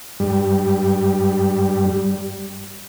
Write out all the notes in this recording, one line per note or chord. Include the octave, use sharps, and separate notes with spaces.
G2 G3